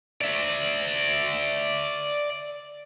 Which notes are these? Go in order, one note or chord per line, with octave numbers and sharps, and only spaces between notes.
D5 E5